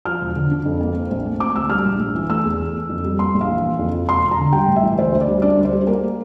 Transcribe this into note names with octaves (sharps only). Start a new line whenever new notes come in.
F3 F6
E1
D3
D4
F2
A#3
C4
A#1
A3
C4 D6
D2 E6
G3 F6
A#1
A#1
E3
A3 E6
E2
E3
A#3
F2
G3
A#3 C6
A#1
F5
E3
A#3
F2
F3
E1 C6
E1
A#5
D3
G3 G5
A1
E5
E3
D2 C5
D2
D5
G3
D4 D5
D2
C5
G3
A#3 A#4